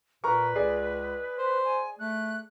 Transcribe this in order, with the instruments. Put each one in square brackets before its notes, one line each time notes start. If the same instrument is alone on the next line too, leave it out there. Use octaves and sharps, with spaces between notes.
[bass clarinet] A#2 [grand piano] A#4 A#5 C#6 [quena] B4
[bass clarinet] C#2 [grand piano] G#4 D5 D#5
[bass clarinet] C5
[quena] G#5
[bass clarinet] A3 [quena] F#6